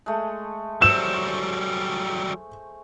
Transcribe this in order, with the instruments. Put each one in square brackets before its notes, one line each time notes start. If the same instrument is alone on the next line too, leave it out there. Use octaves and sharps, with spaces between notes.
[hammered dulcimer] G#3 A3
[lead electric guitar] F#3 G3 [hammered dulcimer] C5 C#6 [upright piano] E6 E7